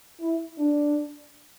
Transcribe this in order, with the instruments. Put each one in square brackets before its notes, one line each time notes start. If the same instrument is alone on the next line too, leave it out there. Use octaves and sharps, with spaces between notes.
[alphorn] E4
D4